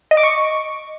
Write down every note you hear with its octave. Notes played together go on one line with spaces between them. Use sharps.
D#5
D6
C#6